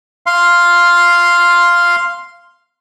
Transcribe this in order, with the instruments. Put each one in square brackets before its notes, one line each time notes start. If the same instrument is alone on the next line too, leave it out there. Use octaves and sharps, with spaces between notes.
[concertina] F5 C6